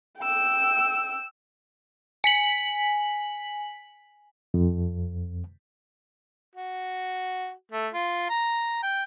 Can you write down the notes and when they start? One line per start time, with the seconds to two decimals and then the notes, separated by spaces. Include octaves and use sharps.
0.19 G5 E6
2.24 G#5 B6 F#7
4.54 F2
6.55 F#4
7.72 A3
7.94 F4
8.30 A#5
8.83 G5